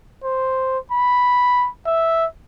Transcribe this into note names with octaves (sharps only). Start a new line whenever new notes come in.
C5
B5
E5